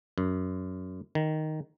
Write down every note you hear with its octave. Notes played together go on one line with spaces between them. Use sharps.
F#2
D#3